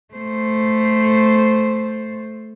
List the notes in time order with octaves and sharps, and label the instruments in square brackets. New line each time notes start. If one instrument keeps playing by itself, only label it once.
[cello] A3 C5